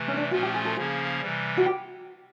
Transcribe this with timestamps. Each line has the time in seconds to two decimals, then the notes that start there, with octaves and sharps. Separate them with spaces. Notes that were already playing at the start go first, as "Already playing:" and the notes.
Already playing: C3 E3 A3
0.08 C#4
0.17 D4
0.31 A#2 F3 A3 C#4 F4 F#4
0.43 G4
0.54 G#4
0.65 A4
0.77 C#3 F3 A#3 C#4 G#4
1.21 C3 E3 G3
1.57 F#4
1.66 G4